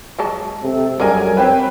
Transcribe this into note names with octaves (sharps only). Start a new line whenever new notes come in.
F#3 G#3 A5
C3 A4
F#2 D3 G3 G#3 A#4 G#5
C4 G4 B4 C#5